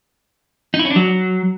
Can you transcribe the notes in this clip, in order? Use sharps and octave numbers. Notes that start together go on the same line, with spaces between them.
D#4
E4
C#4
D4
F#3